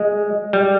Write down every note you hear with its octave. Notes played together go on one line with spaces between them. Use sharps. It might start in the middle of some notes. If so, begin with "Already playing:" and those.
Already playing: G#3
G3